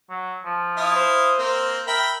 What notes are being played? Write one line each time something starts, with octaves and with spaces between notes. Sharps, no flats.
F#3
F3
E4 F5 D#6
C5
A#3 C4
A#4 E5 G5 B5